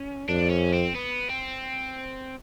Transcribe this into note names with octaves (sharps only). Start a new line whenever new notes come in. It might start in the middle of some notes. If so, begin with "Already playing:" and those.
Already playing: C#4
F2 D4
C#4
C4
B3
C4